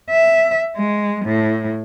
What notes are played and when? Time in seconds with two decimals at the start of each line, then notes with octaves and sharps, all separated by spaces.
0.10 E5
0.76 G#3
1.25 A2